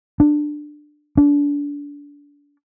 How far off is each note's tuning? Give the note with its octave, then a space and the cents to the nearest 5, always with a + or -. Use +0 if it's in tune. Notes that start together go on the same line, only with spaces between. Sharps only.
D4 +15
D4 -30